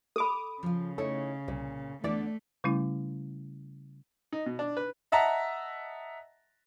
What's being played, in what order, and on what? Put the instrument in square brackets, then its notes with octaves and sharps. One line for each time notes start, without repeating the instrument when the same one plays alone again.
[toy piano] A4 B5 [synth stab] D6 D#6
[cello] C#3 [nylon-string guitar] F3 F4
[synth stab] A3 [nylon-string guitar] D#4 E4 C#5
[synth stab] C2 [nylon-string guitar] A#2
[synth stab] E2 D5 [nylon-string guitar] D3 B3 D4 [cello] A3
[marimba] C#3 G3 A3 C#4 E4
[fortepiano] D#4
B2
D4
B4
[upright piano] D#5 E5 F#5 A5 A#5